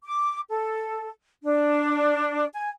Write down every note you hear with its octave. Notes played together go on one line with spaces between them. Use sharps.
D6
A4
D4
G#5